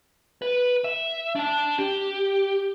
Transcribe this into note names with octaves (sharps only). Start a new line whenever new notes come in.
B4
E5
D4 A5
G4